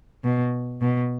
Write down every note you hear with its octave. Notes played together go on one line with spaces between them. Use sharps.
B2
B2